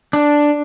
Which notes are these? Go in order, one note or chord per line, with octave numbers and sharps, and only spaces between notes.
D4